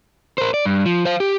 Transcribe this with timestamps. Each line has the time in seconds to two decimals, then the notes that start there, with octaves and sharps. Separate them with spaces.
0.38 A#4 C5
0.54 D5
0.65 G2
0.86 F3
1.05 C5 F5
1.20 G4